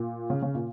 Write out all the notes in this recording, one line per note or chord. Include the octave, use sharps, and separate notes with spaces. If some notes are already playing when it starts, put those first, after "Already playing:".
Already playing: A#2
C#3
C#3
A#2